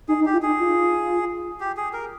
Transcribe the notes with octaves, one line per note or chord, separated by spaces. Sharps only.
D#4 G#4
D#4
G4
F4
D#4 G#4
F4
G4
G#4
A#4